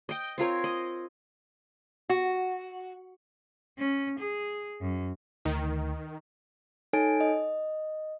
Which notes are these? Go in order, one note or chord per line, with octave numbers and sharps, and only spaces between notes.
D#5 G5
C4 F4 A#4 C#5
D#5
F#4
C#4
G#4
F#2
D2 D#3
D#4 A4 C#5 G#5 D7
D#5